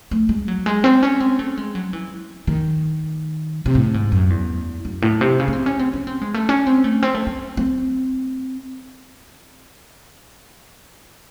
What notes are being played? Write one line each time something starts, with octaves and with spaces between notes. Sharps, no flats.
A3
G#3
F#3
G#3
C4
C#4
C4
A3
G#3
F#3
E3
D#3
C3
A2
G#2
F#2
E2
F#2
A2
C3
C#3
C#4
C4
C#4
C4
C#4
C4
G#3
A3
C#4
C4
A3
C4
A3
C4
C4